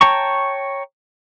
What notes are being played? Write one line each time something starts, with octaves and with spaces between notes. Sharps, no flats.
C#5 G5 A5 A#5 C#6